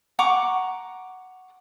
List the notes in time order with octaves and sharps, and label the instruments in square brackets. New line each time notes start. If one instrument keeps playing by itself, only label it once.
[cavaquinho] F#5 A#5 C#6 D6